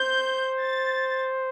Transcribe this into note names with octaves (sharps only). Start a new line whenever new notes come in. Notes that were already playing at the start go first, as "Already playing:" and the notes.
Already playing: C5 G6
A6